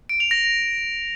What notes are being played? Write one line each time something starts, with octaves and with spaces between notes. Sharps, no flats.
D7
F7
A#6